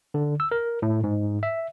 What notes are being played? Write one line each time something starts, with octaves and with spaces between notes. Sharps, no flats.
D3
E6
A#4
A2
G#2
E5